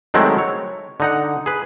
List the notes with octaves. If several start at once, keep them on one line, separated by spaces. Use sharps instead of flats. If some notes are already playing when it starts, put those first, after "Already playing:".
D#3 F#3 G#3 A3 C4 E4
C#5
D3 D#4 F#5
G#4 B4